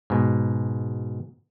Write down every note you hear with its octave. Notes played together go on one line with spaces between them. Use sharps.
G#2 B2